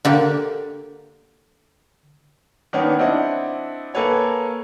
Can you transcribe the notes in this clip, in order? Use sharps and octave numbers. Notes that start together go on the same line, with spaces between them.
D3 A#3 G4
D#3 A#3 B3 C#4 D4
C4 D4 E4 D#5 F#5
A#3 A4 B4 C#5 G#5